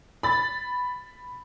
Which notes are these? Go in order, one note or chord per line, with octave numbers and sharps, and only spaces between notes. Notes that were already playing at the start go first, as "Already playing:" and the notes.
B5 A6